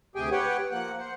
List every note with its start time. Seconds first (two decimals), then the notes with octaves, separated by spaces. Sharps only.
0.15 D2 C3 G4 G#4 G5 G#5
0.31 G4 B4 C#5 F#5 G5
0.72 F3 A#3 F#5 F#6
0.99 C5 F#5